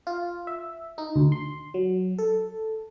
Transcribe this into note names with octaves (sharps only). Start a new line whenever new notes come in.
F4
E5
D#4
D2
C6
F#3
A4